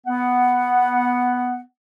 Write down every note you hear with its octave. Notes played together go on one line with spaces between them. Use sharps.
B3 F#5